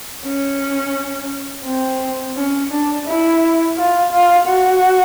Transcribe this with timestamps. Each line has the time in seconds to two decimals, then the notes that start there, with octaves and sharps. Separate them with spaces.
0.26 C#4
1.66 C4
2.36 C#4
2.71 D4
3.07 E4
3.77 F4
4.12 F4
4.47 F#4